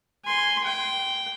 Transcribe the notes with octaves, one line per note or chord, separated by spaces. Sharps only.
G#5 C6
G5